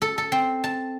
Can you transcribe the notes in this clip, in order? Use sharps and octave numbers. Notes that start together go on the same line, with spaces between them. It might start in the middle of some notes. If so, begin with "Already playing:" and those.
A4
A4
C4
A5